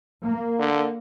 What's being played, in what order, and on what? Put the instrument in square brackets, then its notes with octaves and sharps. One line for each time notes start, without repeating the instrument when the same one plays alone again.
[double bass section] A#3
[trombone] D3